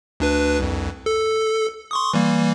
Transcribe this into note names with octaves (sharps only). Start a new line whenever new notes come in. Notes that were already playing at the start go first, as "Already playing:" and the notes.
D2 D4 B4
C2 F2
A4
C6 C#6 D#6
E3 G3 A#3